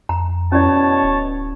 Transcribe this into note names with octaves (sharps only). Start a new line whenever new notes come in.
F2 A#5
B2 C#4 E4 C#5 D5 A5
D1